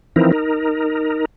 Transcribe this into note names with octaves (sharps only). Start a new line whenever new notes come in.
E3 F3 C4 D#4 E4 A#4
D#4 A#4